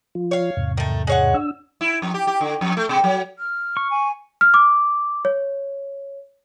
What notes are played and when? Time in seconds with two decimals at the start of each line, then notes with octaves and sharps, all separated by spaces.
0.15 F3 F4
0.31 C#5 F5
0.57 E2 G#2 C3
0.77 D#3 A3
1.07 G#3 C#5 F#5
1.34 D4 E6
1.81 E4
2.02 F2
2.14 G4
2.27 G4
2.41 D3
2.61 F2
2.77 A3
2.89 B2
3.04 F#3
3.38 F6
3.77 C#6
3.90 G#5
4.41 F6
4.54 D6
5.25 C#5